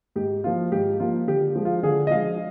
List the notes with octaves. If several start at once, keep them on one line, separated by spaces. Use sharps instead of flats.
G#2 G4
F3 A#3 F4
G#2 G4
F3 A#3 F4
D3 G4
F3 G#3
F4
D3 G#4
D#5
F3 G#3 F5